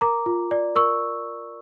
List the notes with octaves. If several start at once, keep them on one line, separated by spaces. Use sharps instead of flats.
A#4 A#5 D6
F4
D5
A#4 C#6 E6